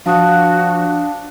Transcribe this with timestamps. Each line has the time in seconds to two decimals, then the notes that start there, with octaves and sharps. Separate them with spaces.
0.06 F3 D4 F#4 F5 A5 D#6